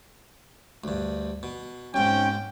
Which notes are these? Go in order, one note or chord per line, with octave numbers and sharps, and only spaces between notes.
D2 G2
B2
B1 G#2 C4 C#4 G5